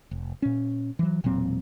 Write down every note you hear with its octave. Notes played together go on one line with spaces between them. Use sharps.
F1
A#2 C#4
E3 F#3
E1 A#2 F#3 C4